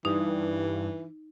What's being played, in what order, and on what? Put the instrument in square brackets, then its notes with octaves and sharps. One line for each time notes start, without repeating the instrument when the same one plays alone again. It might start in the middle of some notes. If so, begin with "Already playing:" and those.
[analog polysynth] G2 [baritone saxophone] E3 [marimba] D#4